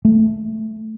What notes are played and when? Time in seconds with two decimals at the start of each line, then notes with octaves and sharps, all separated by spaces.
0.05 A3